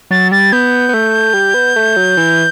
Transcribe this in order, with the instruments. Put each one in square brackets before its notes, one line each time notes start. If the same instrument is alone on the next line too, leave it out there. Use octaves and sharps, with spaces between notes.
[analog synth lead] F#3 [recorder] A6
[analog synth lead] G3 [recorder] A6
[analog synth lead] B3 [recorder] G6
[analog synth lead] B3
A3
G3
B3
A3
F#3
E3